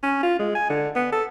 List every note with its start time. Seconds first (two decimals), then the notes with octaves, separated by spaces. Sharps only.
0.03 C#4
0.23 F4
0.39 G#3
0.55 G#5
0.69 D3
0.95 B3
1.12 A4